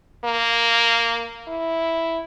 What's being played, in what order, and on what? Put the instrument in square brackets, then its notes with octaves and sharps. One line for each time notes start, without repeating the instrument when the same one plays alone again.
[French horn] A#3
E4